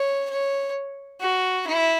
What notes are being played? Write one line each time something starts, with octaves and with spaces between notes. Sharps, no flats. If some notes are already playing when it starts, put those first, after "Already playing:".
Already playing: C#5
C#5
F#4
E4